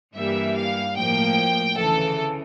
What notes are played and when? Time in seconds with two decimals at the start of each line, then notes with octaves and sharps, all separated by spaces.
0.14 G2 E3 G3 A#3 E5
0.55 F5
0.95 A2 F3 A#3 G5
1.76 D2 C#3 E3 A4